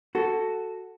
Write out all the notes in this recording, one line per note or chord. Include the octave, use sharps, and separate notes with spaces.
F#4 A4